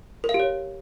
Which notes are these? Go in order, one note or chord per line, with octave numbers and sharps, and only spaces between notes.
A#4
F5
G4
C#5